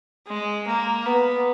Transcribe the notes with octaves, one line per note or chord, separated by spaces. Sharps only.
G#3
A#3
B3